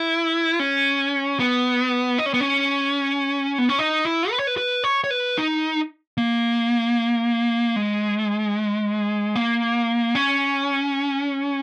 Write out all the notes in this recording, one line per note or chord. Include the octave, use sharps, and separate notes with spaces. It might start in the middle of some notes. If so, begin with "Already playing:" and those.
Already playing: E4
C#4
B3
D#4
C#4
B3
C#4
B3
C#4
D#4
E4
B4
C#5
B4
B4
C#5
C#5
B4
D#4
A#3
G#3
A#3
C#4